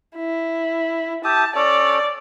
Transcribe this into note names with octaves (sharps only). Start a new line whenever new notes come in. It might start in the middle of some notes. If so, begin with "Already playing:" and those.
E4
G4 E5 A5 D#6
C#4 A4 C#5 D5